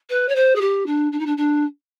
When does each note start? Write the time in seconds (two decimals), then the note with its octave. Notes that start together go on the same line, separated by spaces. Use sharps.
0.09 B4
0.28 C#5
0.35 C5
0.55 G#4
0.61 G4
0.86 D4
1.12 D4
1.19 D#4
1.26 D4
1.37 D4